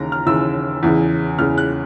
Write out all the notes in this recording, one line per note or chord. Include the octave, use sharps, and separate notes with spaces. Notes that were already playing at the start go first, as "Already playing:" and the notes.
Already playing: D#2 C#3 E3 A#5
F6
D#2 C#3 E3 E6
E2 C#3 E3
E2 C#3 E3 F6
F#6